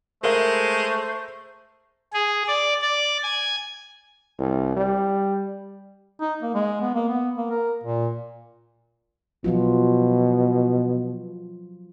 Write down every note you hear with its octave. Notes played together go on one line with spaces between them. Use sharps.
G#3 A3 A#4 C5 E5
G#4
D5
D5
G#5
C2
G3
D#4
A#3
G#3
B3
A#3
B3
A#3
A#4
A#2
B2 F3 F#3 F4